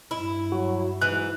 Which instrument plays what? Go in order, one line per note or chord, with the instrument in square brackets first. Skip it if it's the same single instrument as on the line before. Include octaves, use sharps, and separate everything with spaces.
[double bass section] G2 [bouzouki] E4
[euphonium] F#3 [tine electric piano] F#4
[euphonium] G#2 [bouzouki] E3 [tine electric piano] F#6